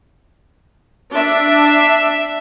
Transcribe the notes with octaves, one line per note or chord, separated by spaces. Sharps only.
D4 E5